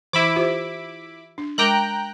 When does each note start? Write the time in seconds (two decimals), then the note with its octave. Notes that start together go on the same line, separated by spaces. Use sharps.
0.13 E3 E4 B5 D6
0.36 F4 G4 C5
1.38 D4
1.58 G#3 A#4 G5 A#5 D6 F#6